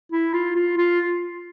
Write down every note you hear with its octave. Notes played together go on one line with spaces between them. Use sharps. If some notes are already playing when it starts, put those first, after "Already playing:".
E4
F4
F4
F4